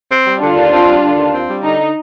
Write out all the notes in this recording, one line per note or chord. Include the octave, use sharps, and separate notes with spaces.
C4
G3
D3 D4 F4
D#2
C4
G3
D3
D#2
C4
G3
D3 D#4